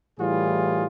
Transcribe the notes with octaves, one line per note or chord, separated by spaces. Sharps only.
A2 E3 G3 F4 G#4